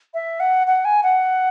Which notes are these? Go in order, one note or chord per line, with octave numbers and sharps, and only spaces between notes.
E5
F#5
F#5
G#5
F#5